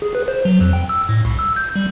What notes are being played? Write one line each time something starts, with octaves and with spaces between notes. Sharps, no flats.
G#4
B4
C5
F#3
F2
G5
E6
A2
C2
E6
G6
G3